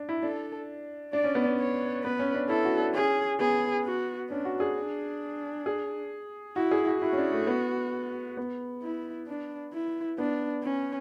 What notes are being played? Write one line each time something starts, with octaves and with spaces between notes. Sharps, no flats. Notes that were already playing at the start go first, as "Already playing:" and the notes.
Already playing: D4
E4
D4 A4
D4 D5
C#4
B3
C#4
C#5
B3 B4
C#4
D4
E4 A4
F#4
D4
C#4 G#4
B3 G#4
F#4
C#4 D4
F#4
G#4
D4
G#4
E4 F#4
G#4
F#4
E4 F#4
C#4
D4
A3
B3
B3
E4
D4
E4
B3 D4
C#4